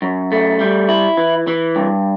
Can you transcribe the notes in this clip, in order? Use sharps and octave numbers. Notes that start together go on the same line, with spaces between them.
F#2
A3
G3
E4
E3
E3
G2